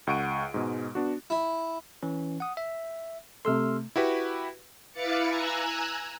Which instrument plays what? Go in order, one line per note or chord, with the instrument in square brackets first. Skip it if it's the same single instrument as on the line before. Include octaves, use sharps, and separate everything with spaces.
[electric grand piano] C#2 F#5 C#6 D7 D#7
G#2 B2 G#3
B3 D4 F#4
[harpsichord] E4
[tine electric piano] E3 C#4
F#5 D#6
E5
[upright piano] C3 A3 [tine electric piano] C6 E6 F6
[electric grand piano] E4 F#4 G4 B4
[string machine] E4 B4 F5 D6 A6 C#7
G#5 A#5 E6 F#6 G#6